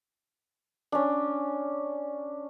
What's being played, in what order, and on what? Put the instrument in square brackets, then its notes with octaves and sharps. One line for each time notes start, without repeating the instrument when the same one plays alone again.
[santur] C#4 D4